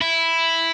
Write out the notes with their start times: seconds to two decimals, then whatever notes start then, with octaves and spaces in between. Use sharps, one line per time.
0.01 E4